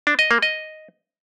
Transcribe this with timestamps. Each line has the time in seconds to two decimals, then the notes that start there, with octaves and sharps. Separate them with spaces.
0.07 D4
0.19 D#5
0.31 A#3
0.42 D#5